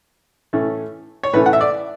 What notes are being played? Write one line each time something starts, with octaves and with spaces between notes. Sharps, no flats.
A2 E3 A3 C#4
C#5
A2 E3 A3 C#4 B4
F#5
E5
D5